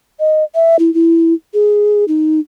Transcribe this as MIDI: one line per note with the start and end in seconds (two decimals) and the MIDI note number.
0.20 0.44 75
0.55 0.76 76
0.79 0.92 64
0.94 1.34 64
1.54 2.05 68
2.08 2.40 63